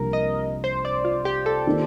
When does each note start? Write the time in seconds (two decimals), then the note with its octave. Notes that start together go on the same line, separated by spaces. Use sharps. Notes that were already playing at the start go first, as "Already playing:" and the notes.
Already playing: C2 C3 F3 A#3 D4 A#4
0.13 D#5
0.64 C5
0.85 D5
1.05 F4
1.25 G4
1.46 A4
1.67 D#3 A#3 F4